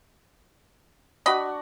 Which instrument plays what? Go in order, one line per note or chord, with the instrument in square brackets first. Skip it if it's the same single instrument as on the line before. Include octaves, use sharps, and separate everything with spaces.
[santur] D4 F#4 F#5 [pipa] D#5 B5